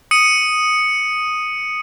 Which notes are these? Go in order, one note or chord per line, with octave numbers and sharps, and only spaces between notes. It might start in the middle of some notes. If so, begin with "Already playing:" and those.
D#6 C#7 D#7